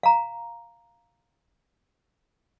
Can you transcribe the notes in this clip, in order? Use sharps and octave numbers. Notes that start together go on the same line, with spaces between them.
F5 A#5